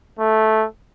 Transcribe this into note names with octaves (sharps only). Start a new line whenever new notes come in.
A3